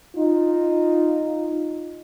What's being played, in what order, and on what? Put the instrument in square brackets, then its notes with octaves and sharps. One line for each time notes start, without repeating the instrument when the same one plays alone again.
[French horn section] D#4 F4